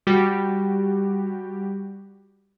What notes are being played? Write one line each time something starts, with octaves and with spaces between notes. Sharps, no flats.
G3 F#4 G4